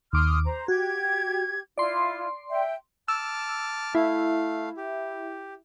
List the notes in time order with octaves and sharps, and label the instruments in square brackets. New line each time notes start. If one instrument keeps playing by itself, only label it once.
[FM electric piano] D#2 D6 [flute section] C6 D#6 F6
[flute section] C5 A#5
[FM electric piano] F#4 [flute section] G4 G#6
[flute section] E4 F4 [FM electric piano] D5 C6
[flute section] E5 G5
[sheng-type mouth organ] A5 D6 F6 [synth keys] E6
[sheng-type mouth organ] A3 F5 [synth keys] E4
[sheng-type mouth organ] G4